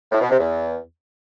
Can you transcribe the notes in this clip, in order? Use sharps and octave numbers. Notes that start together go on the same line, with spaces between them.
A2
B2
C3
E2